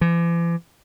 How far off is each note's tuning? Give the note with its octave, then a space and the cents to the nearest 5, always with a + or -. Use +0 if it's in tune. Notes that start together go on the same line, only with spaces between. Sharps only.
E3 +45